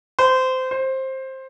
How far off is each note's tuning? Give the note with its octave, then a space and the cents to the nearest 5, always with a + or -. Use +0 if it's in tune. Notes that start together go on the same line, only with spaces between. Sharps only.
C5 -20
C5 +15